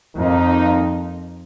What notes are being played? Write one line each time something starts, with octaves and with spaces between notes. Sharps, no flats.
F2 D#3 A#3 D#4